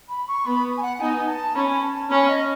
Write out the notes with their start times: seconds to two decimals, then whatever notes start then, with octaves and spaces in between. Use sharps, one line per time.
0.09 B5
0.28 C#6
0.46 B3 B5
0.77 G#5
0.82 F#5
1.00 B3 D#4 G#5
1.28 A5
1.55 C#4 B5
1.83 A5
2.10 C#4 B5
2.28 D#5